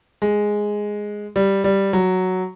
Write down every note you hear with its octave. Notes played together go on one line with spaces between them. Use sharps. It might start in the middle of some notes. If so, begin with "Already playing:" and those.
G#3
G3
G3
F#3